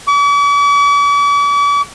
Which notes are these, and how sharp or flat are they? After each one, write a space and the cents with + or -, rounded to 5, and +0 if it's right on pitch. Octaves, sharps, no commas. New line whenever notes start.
D6 -45